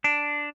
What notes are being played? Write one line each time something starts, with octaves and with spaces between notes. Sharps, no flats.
D4